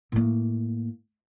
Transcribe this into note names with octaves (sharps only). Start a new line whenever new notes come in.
A2 A#3